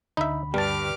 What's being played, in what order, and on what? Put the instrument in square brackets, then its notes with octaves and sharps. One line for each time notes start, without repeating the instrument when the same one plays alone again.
[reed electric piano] D2 D3 B5 [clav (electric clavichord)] D#4 E5
[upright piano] G2 [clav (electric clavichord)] G3 A5 [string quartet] G4 D6 F6